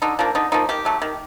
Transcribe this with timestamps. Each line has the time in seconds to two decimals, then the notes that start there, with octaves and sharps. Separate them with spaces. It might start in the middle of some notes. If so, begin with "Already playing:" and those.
0.02 D3 D#4
0.19 F3 A#3 D4
0.35 D3 D#4
0.52 F3 A#3 D#4
0.69 D#3 G4
0.85 F#3 A3
1.02 D#3